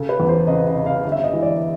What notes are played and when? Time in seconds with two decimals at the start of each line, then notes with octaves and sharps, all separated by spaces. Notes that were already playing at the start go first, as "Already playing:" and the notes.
Already playing: C#3 A4
0.09 B4
0.20 E2
0.29 C5
0.47 C#3 D#5
0.67 D#5
0.76 C#3
0.86 F5
1.05 G1
1.12 E5
1.24 D#5
1.33 E3
1.42 D5